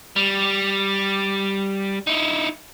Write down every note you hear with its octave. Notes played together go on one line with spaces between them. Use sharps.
G3
D#4 E4